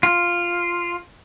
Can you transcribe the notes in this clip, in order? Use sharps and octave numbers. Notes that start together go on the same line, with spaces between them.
F4